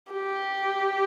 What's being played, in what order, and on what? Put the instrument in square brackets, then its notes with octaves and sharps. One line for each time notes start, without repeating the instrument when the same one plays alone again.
[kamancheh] G4